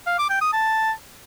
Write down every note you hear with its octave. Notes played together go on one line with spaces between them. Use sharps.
F5
D6
G5
D#6
A5